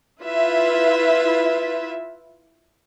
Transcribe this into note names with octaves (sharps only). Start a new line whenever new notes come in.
E4 F4 B4 E5